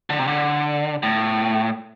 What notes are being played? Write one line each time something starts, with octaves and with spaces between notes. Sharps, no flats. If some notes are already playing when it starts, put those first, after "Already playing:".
D3
C3
D3
A2